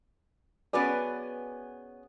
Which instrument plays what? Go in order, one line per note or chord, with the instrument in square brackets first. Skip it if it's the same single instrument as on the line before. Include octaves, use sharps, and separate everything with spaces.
[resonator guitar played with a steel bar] B3 C#4 G#4 [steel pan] F#4 B4 D5